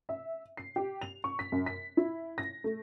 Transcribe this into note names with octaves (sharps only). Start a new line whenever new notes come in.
E5
C7
G4
F7
C#6
B6
F#2
B6
E4
A#6
A3